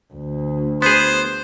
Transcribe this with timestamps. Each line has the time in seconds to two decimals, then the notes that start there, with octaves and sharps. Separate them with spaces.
0.14 D2
0.82 B3 G#4 C5